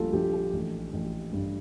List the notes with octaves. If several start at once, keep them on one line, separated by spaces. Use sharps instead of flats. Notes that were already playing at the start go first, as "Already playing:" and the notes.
Already playing: A#1 G3 F4 A4
A#1 G4
A4
A1
A1
G2